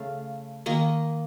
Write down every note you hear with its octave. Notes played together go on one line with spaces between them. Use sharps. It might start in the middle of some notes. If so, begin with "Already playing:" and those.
Already playing: C#3 A3 F5
D#3 A#3 D#5